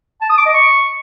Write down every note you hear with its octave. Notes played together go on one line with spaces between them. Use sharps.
A5
D#6
D6
D#5
C#6